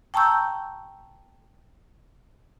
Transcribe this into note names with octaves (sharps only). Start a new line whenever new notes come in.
G5 A5 A#5 C#6 E6 G6